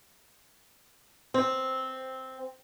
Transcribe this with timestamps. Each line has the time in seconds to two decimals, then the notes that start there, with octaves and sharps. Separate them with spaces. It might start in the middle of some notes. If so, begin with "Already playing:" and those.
1.34 C4